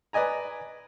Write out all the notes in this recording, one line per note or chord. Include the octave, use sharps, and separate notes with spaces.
B4 D5 D#5 G#5 A#5